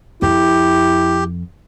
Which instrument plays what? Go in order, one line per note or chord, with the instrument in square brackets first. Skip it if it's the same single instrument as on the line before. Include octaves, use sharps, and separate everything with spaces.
[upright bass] F2 [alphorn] E4 [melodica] G4